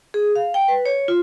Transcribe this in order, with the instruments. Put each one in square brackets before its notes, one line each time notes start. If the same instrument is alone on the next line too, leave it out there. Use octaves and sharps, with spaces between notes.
[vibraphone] G#4
F5
G5
B4
C#5
F4